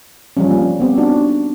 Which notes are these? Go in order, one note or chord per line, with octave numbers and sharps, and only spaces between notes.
F3 G3 C#4
G3 A#3
B3 C4 G4
D4 D#4 F#4